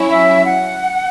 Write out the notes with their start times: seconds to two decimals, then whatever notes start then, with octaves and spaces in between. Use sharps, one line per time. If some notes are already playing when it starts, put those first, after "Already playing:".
Already playing: F#3 C#4 E4
0.10 E5
0.45 F#5